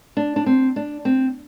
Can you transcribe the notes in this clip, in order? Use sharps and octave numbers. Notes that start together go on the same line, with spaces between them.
D4
D4
C4
D4
C4